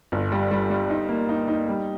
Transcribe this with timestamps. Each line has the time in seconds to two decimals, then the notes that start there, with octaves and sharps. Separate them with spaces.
0.12 G1
0.32 G3
0.51 G3
0.70 G3
0.90 D#4
1.09 A#3
1.29 D#4
1.48 D#4
1.68 G3